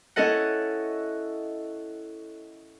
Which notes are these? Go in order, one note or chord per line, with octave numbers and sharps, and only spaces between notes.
C#4 E4 A4 D#5 F#5